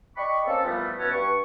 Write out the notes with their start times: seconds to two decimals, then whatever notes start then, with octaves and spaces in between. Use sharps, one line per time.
0.17 D5 D#5 G5 B5 C#6
0.47 A#3 C4 C#4 A4
0.64 A#2 E3 F3 G3 A3 B3
0.99 B2 E3 B3 C#4 A4 F#5
1.12 G2 C#6